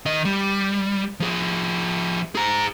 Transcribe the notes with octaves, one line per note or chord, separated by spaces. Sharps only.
D#3 D#5
G3
F3 G#4
G#4 A#5